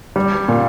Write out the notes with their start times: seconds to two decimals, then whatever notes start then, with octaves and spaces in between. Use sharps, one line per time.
0.16 G3
0.48 A#2